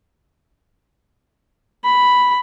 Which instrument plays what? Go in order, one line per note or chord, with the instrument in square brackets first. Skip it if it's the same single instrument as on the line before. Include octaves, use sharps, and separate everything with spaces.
[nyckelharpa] B5